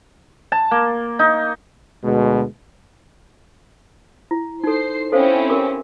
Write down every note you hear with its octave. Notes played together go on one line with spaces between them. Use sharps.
A5
A#3
D#4
D2 B2 G#3
E4
D#4 A4 C5 C7
C4 C#4 E4 A4 C5 F5
G4 A#4 D6